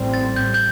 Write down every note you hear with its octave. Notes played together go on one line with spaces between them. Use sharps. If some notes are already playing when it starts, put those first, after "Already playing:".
Already playing: A1 A2 G3 C4
A6
G6
G6